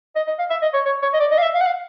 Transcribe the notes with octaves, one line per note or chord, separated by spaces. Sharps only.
D#5
D#5
F5
E5
D#5
C#5
C#5
C#5
D#5
D5
D#5
F5
E5
F5
F#5
F5